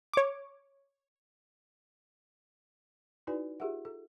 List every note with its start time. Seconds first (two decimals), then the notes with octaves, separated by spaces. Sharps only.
0.13 C#5 D6
3.27 D#4 E4 F#4 B4 D5 G#5
3.60 F4 G4 G#4 A#4 E5 F#5
3.85 A4